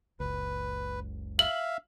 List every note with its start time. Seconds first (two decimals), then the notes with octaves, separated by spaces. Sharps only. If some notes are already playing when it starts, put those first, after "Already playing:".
0.20 F#1 C#2 B4
1.39 E5 F5 F#7